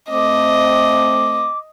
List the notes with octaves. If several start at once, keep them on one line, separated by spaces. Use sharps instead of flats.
A3 C4 D#5 D6